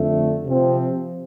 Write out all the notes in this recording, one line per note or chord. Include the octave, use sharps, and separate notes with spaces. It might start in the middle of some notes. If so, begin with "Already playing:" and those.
Already playing: F2 D3 A3
C3 F3 C4